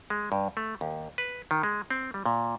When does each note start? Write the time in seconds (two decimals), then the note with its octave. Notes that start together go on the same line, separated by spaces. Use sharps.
0.10 G#3
0.32 G2
0.57 A3
0.81 D#2
1.18 B4
1.51 D#3
1.63 G#3
1.90 C4
2.14 G3
2.26 A#2